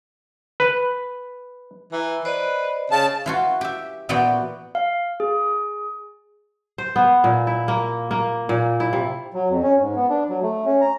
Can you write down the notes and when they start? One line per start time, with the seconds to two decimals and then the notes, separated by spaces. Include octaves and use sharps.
0.60 B4
1.92 E3 A#5
2.25 B4 C5 D5 D#5
2.91 C#3 A5
3.26 E3 F4 F#4
3.61 G4 E5
4.09 A#2 E3 B3 F#4 D5 G5
4.75 F5
5.20 G#4
6.78 C5
6.96 B3
7.24 A#2
7.47 E4
7.68 A#3
8.11 A#3
8.49 A#2
8.80 E4
8.93 C3
9.34 F#3
9.50 F2
9.63 C#4
9.81 G#2
9.96 B3
10.09 D4
10.29 F#3
10.43 A3
10.65 C#4
10.81 A#5